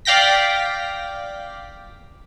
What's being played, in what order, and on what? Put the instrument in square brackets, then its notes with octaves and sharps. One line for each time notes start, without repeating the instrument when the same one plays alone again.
[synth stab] D5 F5 G5 A#6 B6